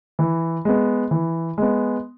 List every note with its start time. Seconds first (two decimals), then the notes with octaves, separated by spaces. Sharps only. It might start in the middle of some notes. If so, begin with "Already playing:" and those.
0.19 E3
0.65 G#3 B3
1.11 E3
1.58 G#3 B3